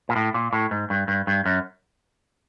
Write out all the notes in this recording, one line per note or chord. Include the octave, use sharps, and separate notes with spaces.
A#2
A2
A#2
A2
G#2
G2
G2
G2
F#2